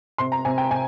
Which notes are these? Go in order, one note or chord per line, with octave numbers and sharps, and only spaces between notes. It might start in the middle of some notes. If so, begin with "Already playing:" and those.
C3 C6
A#5
C3 G#5
G5
C3 G#5